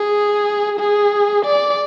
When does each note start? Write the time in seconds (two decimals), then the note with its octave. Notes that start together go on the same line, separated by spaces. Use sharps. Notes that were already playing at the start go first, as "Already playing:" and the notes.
Already playing: G#4
0.79 G#4
1.45 D5